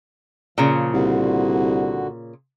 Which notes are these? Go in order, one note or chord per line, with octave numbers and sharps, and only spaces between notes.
A#2 C#3 F3
C2 D3 F#4